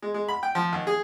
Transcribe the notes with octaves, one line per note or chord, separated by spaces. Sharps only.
G#3
G#3
B5
G5
F3
D#2
G#4